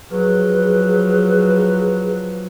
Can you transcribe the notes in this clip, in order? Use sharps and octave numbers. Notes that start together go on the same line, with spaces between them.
F3 F#3 G#4 B4